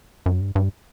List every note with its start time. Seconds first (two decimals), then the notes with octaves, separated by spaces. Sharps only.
0.26 F#2
0.41 G2
0.55 G2